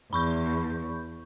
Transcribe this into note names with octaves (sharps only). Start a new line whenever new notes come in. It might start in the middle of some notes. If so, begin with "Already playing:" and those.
E2 B5 C#6 G6